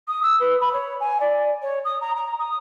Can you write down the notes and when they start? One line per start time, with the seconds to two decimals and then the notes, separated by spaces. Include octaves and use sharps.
0.08 D#6
0.23 E6
0.39 B4
0.61 B5
0.73 C#5
1.00 G#5
1.20 D5
1.62 C#5
1.84 D#6
2.01 A#5
2.16 A#5
2.39 D#6